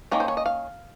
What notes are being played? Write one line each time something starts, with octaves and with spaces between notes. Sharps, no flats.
D#3 A#3 C#4 A#4
C5
C#5
D#5
F5